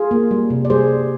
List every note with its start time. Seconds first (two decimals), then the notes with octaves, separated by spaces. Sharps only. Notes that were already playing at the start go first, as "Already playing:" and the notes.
Already playing: F4 G#4
0.11 A#3
0.31 G3
0.50 C3
0.65 D5
0.70 G3 G#4 C5